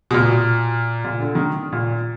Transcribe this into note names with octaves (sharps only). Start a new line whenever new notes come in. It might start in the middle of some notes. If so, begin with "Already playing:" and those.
B2
A#2
A#2
D3
D#3
A#2